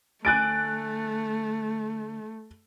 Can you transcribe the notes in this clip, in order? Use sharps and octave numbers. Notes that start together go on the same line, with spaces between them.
D2 A3 G#5 F#6 A6 D7